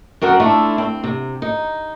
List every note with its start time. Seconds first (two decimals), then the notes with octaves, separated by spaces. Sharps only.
0.22 F#2 C4 A#4 F#5
0.40 A3 D4 E4 F4
0.78 C4
1.03 C3
1.42 D#4